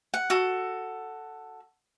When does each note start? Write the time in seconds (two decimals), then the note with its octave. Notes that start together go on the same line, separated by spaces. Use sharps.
0.14 F#5
0.30 F#4 A4